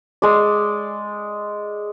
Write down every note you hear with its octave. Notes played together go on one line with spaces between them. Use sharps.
G#3 D5